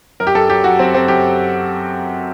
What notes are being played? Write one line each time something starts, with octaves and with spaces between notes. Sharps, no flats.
F#2 A#4
G4
F#2 A4
F#3 G4
F#3 F#4
F#2 C4
F#3 C4
F#2 G4